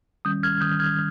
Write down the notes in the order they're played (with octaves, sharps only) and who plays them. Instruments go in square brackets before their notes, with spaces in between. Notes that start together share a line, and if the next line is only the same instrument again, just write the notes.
[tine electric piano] D#3 G3 C#4 D#6 G6
F6 G#6
D#3 G3 C#4 D#6 G6
F6 G#6